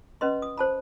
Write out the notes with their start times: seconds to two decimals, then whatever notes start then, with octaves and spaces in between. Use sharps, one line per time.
0.21 C#4 B4 D#5 C6
0.42 D#6
0.58 C5 A5 B5